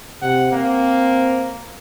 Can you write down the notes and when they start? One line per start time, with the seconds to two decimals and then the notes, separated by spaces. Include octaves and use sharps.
0.22 C3 F#5
0.52 A#3 C4